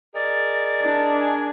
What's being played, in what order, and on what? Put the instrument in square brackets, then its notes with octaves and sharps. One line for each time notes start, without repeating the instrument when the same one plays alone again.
[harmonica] G#4 A#4 [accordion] D5 D#5 [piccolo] A6
[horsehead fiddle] D4
[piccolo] G#5